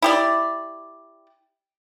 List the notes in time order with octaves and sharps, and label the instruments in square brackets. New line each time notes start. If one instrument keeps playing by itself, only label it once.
[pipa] E4 G4 D5